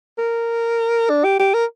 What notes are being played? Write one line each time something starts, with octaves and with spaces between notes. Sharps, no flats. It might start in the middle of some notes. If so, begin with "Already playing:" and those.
A#4
D4
G4
G4
A#4